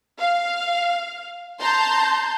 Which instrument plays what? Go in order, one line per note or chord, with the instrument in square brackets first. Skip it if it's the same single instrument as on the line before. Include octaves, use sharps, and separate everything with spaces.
[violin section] F5
A5 A#5 C6 G6